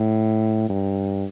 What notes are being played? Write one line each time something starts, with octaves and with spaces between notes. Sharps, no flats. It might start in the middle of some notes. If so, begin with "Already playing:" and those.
Already playing: A2
G2